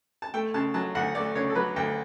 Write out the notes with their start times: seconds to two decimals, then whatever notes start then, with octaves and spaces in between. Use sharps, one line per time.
0.22 A5
0.34 A3 G5
0.54 C#3 A5
0.74 F#3 A5
0.95 D2 F#5
1.15 A3 D5
1.35 C#3 C#5
1.50 A4
1.55 F#3 B4
1.76 D2 G5